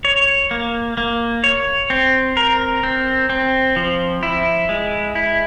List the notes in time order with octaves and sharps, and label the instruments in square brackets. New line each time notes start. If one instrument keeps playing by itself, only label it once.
[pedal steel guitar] C#5
A#3
A#3
C#5
C4
A#4
C4
C4
F3
E4
G#3
E4